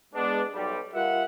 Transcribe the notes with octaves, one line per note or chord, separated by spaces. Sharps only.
G#3 B3 D4
B1 G3
G3 F4 A#4 E5 F#5